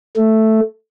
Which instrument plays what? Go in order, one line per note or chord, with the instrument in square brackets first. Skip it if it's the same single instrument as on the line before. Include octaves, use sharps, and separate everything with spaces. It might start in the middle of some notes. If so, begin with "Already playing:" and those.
[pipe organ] A3